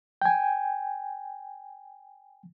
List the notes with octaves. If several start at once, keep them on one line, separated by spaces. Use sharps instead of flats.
G5 G#5